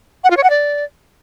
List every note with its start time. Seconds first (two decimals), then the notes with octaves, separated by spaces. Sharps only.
0.24 F#5
0.31 F4
0.37 C#5
0.43 F#5
0.50 D5